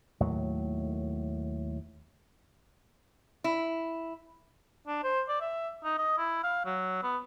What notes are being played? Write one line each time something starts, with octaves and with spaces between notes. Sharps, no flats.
D#2 A2 F#3
E4
D4
C5
D5
E5
D#4
D#5
E4
F5
F#3
B3